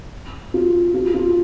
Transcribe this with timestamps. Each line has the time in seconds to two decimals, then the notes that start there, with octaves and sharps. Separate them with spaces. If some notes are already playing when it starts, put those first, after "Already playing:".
0.54 F4
0.94 F4
1.14 F4